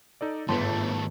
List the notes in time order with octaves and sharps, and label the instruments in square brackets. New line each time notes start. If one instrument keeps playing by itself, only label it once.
[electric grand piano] D#4 A4 D5
[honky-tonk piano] G1 [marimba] G#2 B4 [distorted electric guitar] D#3 A3 [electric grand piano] A5